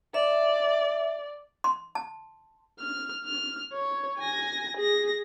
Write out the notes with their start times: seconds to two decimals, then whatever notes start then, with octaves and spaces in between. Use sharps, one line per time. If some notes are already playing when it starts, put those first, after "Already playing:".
0.14 D5 E5
1.64 C6
1.95 A5
2.80 F6
3.25 F6
3.73 C#5
4.19 G#5 A#6
4.77 G#4 A#6